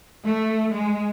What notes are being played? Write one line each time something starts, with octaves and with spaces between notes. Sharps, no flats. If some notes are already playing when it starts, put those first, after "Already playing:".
A3
G#3